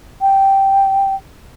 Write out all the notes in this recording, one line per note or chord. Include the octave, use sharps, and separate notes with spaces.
G5